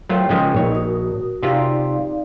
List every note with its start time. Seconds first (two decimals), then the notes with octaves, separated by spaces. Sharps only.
0.09 F#3 A3 F4 A#4 C5 G5
0.29 C#3 F3 G#3
0.55 A#1 D#4 C#5 D#5
0.75 F#4 A#4 D#6
1.43 C3 D#4 F4 G4 D5 F5